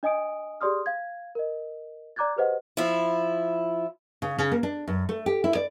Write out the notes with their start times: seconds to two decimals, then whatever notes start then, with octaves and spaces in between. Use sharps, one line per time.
0.03 D4 D#5 G#5 D#6 D7
0.61 G4 G#4 D5 C6 D#6 F6
0.86 F5 G#6
1.35 A#4 D#5
2.16 D5 A#5 D6 F#6 G#6 A6
2.36 G4 G#4 B4 C5 D#5 F#5
2.77 F3 E4
4.22 C#3
4.38 C#3
4.52 A#3
4.63 D4
4.88 F#2
5.09 A3
5.26 G4
5.44 E4
5.55 D5